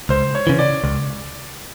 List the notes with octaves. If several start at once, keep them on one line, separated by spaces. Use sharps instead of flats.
C#2 C5
C#5
C#3 E3
D5
C#2